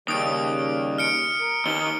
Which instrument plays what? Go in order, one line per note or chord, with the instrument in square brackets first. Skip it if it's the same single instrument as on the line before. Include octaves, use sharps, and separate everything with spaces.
[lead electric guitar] D#2 [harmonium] C#3 G3 [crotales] D#6 D7
[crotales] F6 C#7 D7
[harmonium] A#4
[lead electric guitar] D#2 D#3 [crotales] G7